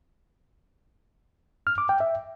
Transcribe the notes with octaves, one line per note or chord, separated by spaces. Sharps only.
F6
D6
G5
E5